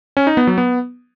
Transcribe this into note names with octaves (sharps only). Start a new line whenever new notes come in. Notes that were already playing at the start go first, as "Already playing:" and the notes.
C#4
D#4
B3
F#3
B3